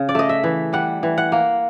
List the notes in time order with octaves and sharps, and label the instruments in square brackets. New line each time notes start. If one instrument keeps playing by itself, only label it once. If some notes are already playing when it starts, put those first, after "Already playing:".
Already playing: [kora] C#3
D5
A3 D#5
E5
E3
G3 F#5
E3
F#5
A#3